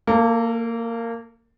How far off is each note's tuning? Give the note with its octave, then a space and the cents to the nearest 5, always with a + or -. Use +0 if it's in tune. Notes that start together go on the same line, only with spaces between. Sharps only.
A#3 -15 A4 +25